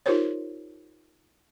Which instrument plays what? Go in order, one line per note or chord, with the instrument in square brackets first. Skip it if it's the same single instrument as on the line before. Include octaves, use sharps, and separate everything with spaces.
[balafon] D#4 F4 G4 A#4 C5 C#5